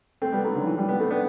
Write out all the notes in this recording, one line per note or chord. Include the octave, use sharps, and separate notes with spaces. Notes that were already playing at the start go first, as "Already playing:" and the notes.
A3 C4
G3 B3
F#3 A3
D3 F#3
E3
E3 G3
G3 B3
A3 C4
B3 D4